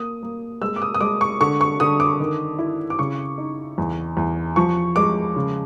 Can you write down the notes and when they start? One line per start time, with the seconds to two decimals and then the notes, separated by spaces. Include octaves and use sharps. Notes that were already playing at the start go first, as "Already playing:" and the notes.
Already playing: A#3 D#6
0.23 A#3
0.61 G#3 E6
0.76 D6
0.82 D#6
0.95 D#6
1.01 G#3 D6
1.21 C#6
1.41 D3 C#6
1.61 C#6
1.80 D3 D#6
2.00 D6
2.20 D#3
2.59 E4
2.90 D6
2.99 C#3 C#6
3.38 D#4
3.78 E2
4.17 E2
4.56 F3 C#6
4.96 G#3 D6
5.36 C#3